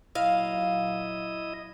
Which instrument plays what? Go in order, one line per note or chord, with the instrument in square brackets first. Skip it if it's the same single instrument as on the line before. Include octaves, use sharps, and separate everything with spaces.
[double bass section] A#2 F#3 [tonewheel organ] E4 D#5 [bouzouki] F5